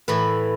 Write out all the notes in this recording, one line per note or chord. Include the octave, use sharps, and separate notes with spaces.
A2 E3 B4